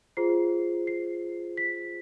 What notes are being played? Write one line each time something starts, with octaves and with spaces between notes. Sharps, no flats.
F4 G#4 C5 C7
C7
B6